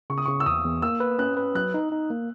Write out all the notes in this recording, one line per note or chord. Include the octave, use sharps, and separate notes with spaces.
C#3 C#6
D#6
C#3 C#6
E6
E2 D#6
E2
A#3 E6
B4
C#4 F#6
B4
F#3 F#6
D#4
D#4
A#3